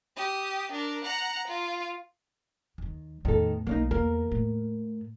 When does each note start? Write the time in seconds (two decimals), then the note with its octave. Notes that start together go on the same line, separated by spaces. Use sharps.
0.16 G4 D#6
0.72 D4 A#4
1.04 F#5 A#5
1.48 F4
2.78 D#2 D#3
3.25 E2 A2 D#3 A4
3.67 B1 A#3 D4 D#4
3.91 E2 A#3 A#4
4.32 A2